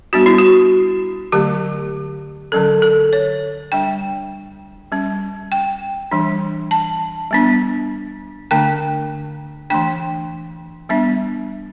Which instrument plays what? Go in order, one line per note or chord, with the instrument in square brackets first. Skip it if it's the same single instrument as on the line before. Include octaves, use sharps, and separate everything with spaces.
[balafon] G3 B3 D4 F#4
E4
F#4
D3 F#3 A3 G4
D3 F#3 C#4 A4
A4
C#5
G3 D4 G5
G3 C#4
G5
E3 G3 D4
A5
G3 B3 D4
D3 A3 D4 G5
E3 A3 D4 G5
G3 B3 D4 E5